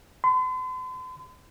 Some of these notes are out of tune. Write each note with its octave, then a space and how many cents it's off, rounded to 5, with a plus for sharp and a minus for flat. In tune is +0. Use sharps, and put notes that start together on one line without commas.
C6 -45